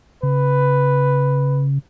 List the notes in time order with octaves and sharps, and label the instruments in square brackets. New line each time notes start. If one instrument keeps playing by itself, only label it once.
[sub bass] C#3 [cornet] B4